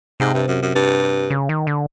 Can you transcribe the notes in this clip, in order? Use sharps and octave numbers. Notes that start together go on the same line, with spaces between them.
G#2 C3
G2
F#2
F#2
G2
C#3
D#3
D3